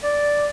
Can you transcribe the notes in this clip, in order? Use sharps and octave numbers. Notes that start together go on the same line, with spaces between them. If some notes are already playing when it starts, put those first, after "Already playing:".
D5